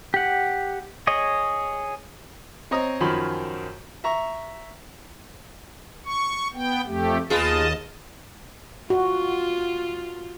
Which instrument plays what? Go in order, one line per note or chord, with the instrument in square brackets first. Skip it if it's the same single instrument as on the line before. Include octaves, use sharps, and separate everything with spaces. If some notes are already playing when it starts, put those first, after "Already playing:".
[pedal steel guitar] G4 F#5
G#4 C#5 D#5
[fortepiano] C4 C#5 D#5 A#5 D#6
F#2 D#3 F3 C#4 B5 C6
E5 A#5 C#6
[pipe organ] C#6
B3 G5
F2 A3 G4
[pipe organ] D#2 D#5 A5 [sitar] B3 F4 G#4
[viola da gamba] F4 [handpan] F#4